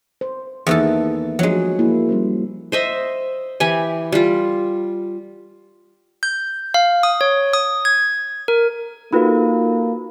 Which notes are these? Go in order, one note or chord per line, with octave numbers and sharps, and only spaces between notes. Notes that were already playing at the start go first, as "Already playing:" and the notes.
C5
E2 D#3 E3 A#3 D#4 A4
F3 F#3 G#3 D4
A3 F#4
A#3 E4
G3 C#4 C5
C5 D#5 E5
E3 E4 G4 G#5
G3 F4
G6
F5
D#6
C#5
D#6
G#6
A#4
A#3 D#4 F4 F#4 A4 B4 B5